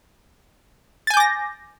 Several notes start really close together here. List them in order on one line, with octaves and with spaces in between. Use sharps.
A6 G#5 G6 D6 A#6